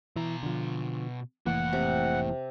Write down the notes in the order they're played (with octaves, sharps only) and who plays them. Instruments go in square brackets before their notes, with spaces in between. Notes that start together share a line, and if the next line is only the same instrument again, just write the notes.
[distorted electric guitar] B2 A#5 [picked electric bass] E3
[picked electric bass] D3 F3
[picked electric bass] F1 E3 A#3 [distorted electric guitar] A3 E4 [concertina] F#5
[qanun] C3